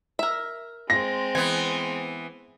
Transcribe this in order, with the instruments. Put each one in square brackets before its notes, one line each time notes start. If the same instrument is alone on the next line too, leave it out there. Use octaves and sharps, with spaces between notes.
[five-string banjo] A#4 E5
[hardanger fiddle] G#3 C4 [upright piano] A#6
[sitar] E3 B3 [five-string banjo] G#5